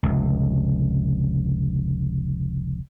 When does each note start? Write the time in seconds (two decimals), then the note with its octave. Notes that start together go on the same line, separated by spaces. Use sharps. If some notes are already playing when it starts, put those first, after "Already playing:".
0.03 F1 C#2